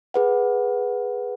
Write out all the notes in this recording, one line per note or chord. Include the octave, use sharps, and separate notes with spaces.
G#4 B4 F#5